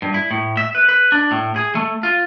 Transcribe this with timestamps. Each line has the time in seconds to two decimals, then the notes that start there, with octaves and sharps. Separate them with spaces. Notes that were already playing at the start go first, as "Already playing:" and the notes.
0.02 G2
0.14 E4
0.31 A2
0.57 E5
0.75 B4
0.89 B4
1.12 D4
1.31 A2
1.56 G#4
1.75 A3
2.03 F4